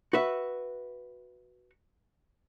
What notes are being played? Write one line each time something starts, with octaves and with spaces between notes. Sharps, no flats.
F#4 B4 E5